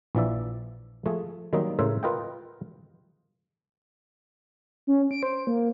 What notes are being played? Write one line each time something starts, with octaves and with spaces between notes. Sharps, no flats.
A#1 E3 F3 D5 E5
F3 A3 G#4
D#3 F#3 G3 A#3 C4 D#4
A2 C#3 A#4 C5 E5
F4 A#4 B4 D#5 F#5 G5
C#4
D7
C5
A#3